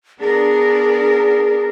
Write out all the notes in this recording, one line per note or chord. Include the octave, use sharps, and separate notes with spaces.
B3 D4 G#4 A#4